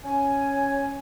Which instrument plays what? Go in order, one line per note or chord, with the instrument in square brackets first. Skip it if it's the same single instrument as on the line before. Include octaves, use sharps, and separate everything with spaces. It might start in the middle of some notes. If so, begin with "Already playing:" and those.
[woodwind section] C#4 G#5